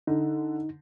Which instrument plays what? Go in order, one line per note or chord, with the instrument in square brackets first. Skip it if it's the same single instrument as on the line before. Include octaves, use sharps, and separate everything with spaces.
[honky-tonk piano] D3 [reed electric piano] D#4